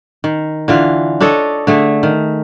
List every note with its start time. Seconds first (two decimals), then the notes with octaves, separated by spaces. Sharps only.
0.24 D#3
0.68 D3 E3 F4
1.21 D4 A4 C#5 D#5
1.67 D3 A3 G#4
2.03 D#3